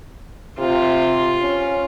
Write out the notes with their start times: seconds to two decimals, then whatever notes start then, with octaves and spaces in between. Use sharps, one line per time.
0.58 C3 F4 C6
1.41 C#4